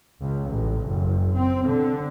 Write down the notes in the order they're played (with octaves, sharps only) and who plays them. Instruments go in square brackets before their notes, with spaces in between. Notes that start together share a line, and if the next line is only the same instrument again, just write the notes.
[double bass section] C#2
A1
F#1
C4
D3